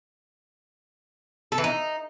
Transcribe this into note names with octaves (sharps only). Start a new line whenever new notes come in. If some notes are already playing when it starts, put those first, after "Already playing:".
A4
E3
D#4